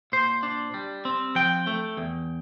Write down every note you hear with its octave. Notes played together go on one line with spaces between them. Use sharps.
A#2 C5
D4
G3
C4
F3 G5
A3
E2